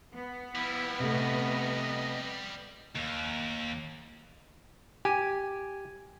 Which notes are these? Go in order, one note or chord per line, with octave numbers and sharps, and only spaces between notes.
B3
F3 G3 E4
C3 A3 D#5
D#2
G4 G#5